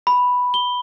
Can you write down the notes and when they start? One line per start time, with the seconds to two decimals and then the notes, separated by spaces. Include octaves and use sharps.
0.07 B5
0.54 G7